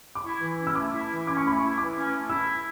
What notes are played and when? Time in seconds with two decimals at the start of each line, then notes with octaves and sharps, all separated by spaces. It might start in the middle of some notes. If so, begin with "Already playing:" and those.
0.15 D6
0.24 E4 C#6
0.41 E3
0.59 C#4
0.67 E6
0.75 A3 D6
0.93 E4
1.09 E3
1.26 C#4 D6
1.37 C#6
1.44 A3 B5
1.57 E4 C#6
1.78 E3 D6
1.96 C#4
2.12 A3
2.29 E4 E6